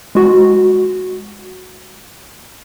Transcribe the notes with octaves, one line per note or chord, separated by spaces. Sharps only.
G#3 F#4